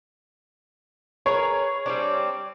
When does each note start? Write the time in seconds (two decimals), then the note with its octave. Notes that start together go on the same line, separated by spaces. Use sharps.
1.26 G#4 A#4 B4 C#5
1.86 G3 C4 D4